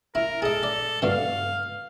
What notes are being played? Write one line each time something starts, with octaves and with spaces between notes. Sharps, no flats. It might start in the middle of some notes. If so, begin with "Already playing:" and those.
E4 A#4
G#4 A4 D#5
D5
G2 B2 D3 F5